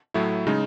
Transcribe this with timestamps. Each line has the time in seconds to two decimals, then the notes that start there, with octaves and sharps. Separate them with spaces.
0.14 A2 F#3 A3 E4
0.47 C#3 G#3 D#4